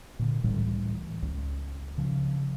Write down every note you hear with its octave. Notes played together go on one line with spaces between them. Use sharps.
A#2 D3
C#2 A2 E3 G3
C#2
C#3 F3